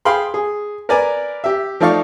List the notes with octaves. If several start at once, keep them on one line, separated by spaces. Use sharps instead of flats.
G#4 F5 G5 B5 C6
G#4
A#4 B4 D5 G#5 A#5
G4 E5
F3 A3 D#4 D5 F5 C#6